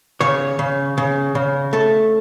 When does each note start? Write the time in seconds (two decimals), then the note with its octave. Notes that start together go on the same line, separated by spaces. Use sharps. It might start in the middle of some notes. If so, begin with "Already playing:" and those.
0.21 C#3 C#5
0.59 C#3
0.98 C#3
1.35 C#3
1.73 A3 A4